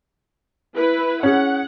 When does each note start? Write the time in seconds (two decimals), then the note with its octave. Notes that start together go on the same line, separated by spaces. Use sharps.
0.76 E4 B4
1.23 C#4 G#4 F#5